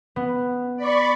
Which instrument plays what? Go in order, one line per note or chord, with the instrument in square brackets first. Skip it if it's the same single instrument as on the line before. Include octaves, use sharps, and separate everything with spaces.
[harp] B3
[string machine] D5 B5 C#6